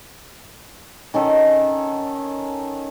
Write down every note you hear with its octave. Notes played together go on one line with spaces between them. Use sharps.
D#3 C#4 A4